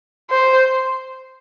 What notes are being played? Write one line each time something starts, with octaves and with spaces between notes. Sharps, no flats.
C5